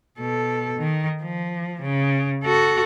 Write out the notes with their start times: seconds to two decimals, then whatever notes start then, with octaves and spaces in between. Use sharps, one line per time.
0.19 B2 A4
0.78 D#3
1.22 F3
1.81 C#3
2.44 F#4 A4